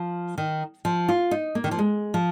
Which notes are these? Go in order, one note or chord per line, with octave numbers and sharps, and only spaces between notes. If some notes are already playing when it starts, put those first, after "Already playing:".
Already playing: F3
D#3
F3
F4
D#4
A#3
D#3
F3
G#3
F3